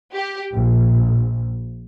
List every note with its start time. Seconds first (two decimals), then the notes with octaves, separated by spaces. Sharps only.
0.13 G4
0.53 A#1